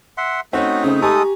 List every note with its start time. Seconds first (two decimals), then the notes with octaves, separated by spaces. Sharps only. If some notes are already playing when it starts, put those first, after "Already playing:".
0.18 E5 F#5 C6
0.53 A3 C4 C#4 D#4 F#4
0.84 C#3 C4 C#4
1.02 G#3 G4 A4 G#5 A#5 C#6 D#6